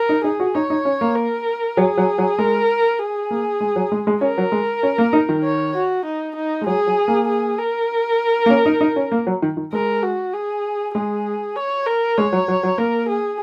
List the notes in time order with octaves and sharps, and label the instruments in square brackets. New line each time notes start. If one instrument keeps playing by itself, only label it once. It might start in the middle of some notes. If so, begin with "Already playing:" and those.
Already playing: [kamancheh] A#4
[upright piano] D#4
[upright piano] D#4 [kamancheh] G#4
[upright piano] F#4
[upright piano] D#4 [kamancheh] C#5
[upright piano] D#4
C#4
A#3
[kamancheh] A#4
[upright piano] F#3 [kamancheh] G#4
[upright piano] F#3
F#3
[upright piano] G#3 [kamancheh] A#4
[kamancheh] G#4
[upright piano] A#3
G#3
F#3
G#3
G#3
[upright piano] C#4 [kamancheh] A#4
[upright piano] F#3
G#3
C#4
A#3
D#4
D#3
[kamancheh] C#5
F#4
D#4
D#4
[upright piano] G#3
[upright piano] F#3 [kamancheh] G#4
[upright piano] F#3
A#3
[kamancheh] G#4
A#4
[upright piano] A#3
C#4
D#4
D#4
C#4
A#3
F#3
D#3
D#3
[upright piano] G#3 [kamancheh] A#4
[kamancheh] F#4
G#4
[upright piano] G#3 [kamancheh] G#4
[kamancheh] C#5
A#4
[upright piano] G#3 [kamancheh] C#5
[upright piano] F#3
F#3
F#3
[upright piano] A#3 [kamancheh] A#4
[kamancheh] G#4